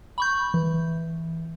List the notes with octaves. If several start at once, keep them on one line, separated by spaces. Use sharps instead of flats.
B5 C#6 G6
E3